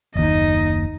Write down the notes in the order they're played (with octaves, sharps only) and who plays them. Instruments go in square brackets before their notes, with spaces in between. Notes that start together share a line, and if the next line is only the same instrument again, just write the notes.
[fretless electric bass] F#1 D#2 [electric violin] D#4 D#5